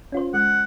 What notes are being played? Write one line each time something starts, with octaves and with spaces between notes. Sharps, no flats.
C#4 F4 C5
G#3 F#5